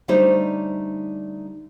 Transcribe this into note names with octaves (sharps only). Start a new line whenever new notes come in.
D3 G3 A3 D#4 C5 C#5